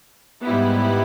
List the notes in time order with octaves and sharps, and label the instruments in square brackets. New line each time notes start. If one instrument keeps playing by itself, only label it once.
[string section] G#2 G3 B3 E4